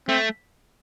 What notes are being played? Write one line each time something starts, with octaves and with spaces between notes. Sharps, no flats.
A3 C4